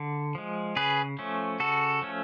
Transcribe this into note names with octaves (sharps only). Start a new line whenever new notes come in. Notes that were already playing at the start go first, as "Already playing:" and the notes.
Already playing: D3
F3 G#3
C#3 G#4 B4
F3 A3 C#4
C#3 F#4 A4
F3 A3 C#4